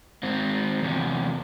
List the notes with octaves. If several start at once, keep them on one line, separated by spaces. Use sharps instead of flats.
G#2 C4
E2 C3